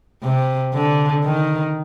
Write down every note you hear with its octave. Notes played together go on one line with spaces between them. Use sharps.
C3
D3
D#3